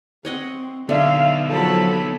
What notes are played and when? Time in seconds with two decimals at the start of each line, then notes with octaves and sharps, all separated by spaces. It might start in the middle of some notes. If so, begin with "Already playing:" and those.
0.25 C4 C#5 D#5 F#5
0.89 D3 B3 D#4 E5 F5
1.50 F3 F#3 A4 B5